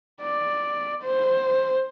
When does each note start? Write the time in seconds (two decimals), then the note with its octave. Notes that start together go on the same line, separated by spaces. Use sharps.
0.22 D5
1.02 C5